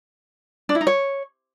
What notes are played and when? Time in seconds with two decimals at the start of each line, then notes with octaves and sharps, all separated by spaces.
0.69 D4
0.75 E4
0.81 D#4
0.87 C#5